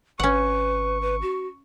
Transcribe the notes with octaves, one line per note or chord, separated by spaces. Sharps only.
G#1 C#4 B4 F#5 C#6
B4
F#4